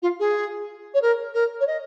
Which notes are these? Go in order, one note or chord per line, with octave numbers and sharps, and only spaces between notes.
F4
G#4
C#5
A#4
A#4
C#5
D#5